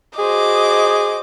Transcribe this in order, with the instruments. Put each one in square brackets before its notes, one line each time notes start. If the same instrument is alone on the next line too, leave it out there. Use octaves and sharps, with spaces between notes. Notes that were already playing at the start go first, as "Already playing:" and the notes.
[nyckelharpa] F#4 C5 [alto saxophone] G#4 [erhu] D#5 [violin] D6